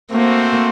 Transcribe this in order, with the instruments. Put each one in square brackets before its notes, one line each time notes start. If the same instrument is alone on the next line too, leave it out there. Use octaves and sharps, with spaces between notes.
[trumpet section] A3 C4 F#4 C5 [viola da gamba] A#3